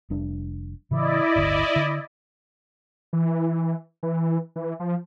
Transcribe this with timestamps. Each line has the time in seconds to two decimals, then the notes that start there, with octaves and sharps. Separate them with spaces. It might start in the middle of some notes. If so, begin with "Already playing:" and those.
0.10 F1 G3 D4
0.91 A2 C#3 E3 E4 D5 D#5
1.36 D1 G1 D3
1.76 D3
3.13 E3
4.03 E3
4.56 E3
4.80 F3